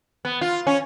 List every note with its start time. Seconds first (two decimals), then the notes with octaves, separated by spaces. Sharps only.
0.25 B3
0.41 F4
0.67 C#4